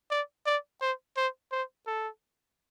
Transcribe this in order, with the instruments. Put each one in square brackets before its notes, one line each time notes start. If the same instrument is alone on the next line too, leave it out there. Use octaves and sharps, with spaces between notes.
[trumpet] D5
D5
C5
C5
C5
A4